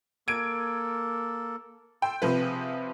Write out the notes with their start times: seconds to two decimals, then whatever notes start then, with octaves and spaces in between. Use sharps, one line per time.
0.28 A#3 A4 G#6 D7
2.02 A4 G5 C6 E6
2.22 C3 F3 B4 C5
2.41 G#4 G5